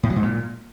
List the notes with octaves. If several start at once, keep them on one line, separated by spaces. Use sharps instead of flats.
A2
F#3
G#2
A#2